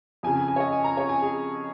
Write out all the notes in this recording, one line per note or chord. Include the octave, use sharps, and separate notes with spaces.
F2 C#3 G#5
G#5
G#5
C#5
D#5
G#5
A#5
C#5
G#5
G#4